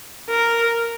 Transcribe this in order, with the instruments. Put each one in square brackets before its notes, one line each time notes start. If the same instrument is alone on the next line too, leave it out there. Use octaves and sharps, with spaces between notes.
[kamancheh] A#4